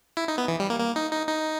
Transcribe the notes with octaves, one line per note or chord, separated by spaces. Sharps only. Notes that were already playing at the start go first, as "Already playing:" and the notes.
E4
D#4
B3
E3
G3
A#3
A#3
D#4
D#4
D#4